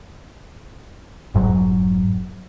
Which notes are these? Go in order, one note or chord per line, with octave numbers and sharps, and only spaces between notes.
F1 G#2 F#3